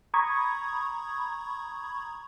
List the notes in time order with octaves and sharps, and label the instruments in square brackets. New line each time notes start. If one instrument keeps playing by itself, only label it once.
[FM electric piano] A#5 B5 C#6 D#6 G#6